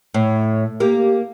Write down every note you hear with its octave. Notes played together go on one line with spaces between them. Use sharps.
A2 C#5
A#3 G4